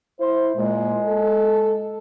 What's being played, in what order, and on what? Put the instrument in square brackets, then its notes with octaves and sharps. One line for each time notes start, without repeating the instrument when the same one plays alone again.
[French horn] E4 [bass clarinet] C5
[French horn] A#2 [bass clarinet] G#3
[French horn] A4